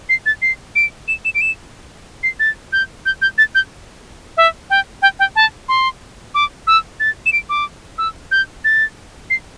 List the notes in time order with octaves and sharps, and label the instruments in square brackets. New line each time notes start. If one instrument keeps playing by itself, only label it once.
[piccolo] C7
A6
C7
D7
E7
E7
D7
E7
C7
A6
G6
G6
G6
A6
G6
E5
G5
G5
G5
A5
C6
D6
E6
A6
E7
D7
D6
E6
G6
A6
C7